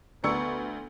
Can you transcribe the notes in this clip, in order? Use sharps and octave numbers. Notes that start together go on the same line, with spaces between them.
D2 B3 E4 D5 C#6 E6 C#7